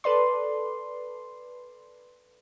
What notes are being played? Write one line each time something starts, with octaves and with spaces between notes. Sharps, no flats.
A4 B4 D5 C6